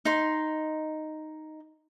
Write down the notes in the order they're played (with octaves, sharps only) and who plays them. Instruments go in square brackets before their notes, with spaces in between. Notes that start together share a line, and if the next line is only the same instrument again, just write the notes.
[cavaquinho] D#4 C6